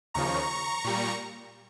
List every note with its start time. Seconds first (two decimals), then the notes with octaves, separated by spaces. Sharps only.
0.14 D#2 C#3 F3 A#5 C#6
0.84 A#2 G3